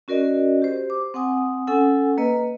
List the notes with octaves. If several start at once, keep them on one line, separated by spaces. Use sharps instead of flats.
C#4 F#4 A#4 D5 D#5
G4 C5
D6
C4 F#5 G#5 D#6
C#4 A4 F#5 G#5 E6
A#3 B4 D#5